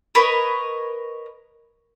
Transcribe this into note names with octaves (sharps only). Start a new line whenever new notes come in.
A#4 B4 C#5 D#5